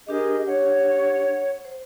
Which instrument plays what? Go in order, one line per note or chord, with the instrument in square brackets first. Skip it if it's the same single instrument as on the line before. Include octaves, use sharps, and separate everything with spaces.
[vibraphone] D4 G4 [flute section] G#4 A#4 D#5
[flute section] C#5 F#5
[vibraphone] C5